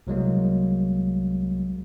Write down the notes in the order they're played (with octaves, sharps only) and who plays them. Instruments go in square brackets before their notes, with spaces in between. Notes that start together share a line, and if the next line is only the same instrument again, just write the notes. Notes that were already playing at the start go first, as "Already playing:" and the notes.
[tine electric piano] C2 F#3 G#3 A#3